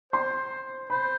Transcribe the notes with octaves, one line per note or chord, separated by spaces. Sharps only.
C5 C6
C5 B5